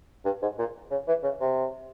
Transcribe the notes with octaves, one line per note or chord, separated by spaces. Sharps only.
G2
G#2
A#2
C#3
E3
C#3
C3